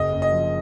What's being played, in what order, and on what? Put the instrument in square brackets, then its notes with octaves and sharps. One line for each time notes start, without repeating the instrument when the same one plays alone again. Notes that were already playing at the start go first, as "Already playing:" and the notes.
Already playing: [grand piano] F#1 [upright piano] D#5
[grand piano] F#1
[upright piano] D#5
[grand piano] F3